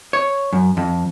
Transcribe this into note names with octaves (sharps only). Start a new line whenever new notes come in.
C#5
F#2
F2